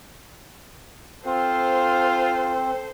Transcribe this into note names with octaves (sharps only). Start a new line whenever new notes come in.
C4 F4 A4 C5